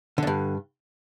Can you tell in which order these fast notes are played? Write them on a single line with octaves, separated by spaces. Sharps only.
D3 E2 G2